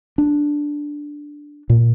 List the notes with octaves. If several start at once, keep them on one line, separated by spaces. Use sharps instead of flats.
D4
A#2